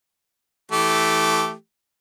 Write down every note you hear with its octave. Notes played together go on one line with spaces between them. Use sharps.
E3 A3 G4